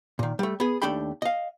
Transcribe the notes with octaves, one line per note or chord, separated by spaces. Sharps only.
A#2 D#3
G3 A3
B3 G#4
D#2 A3 D4 G4 G5 B5
D#5 F5